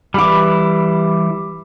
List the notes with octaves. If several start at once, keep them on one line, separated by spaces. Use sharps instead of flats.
E3 G3 B5 D6